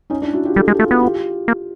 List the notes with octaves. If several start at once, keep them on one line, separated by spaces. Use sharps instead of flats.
C#4 D#4
D4 E4
E4 F#4
F4 G4
G3 G4 A4
G#3 G4 A4
G#4
A3 F4 G4
B3 E4 F#4
F4 G4
A#3